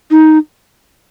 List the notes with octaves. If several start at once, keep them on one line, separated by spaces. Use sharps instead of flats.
D#4